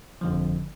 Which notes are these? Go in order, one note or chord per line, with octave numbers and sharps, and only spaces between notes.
G1 F2 D3 F3